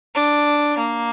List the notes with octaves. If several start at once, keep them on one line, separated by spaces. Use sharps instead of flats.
D4
A#3